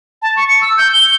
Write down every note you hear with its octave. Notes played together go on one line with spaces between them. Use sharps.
A5
C#6
C#7
E6
G6
G7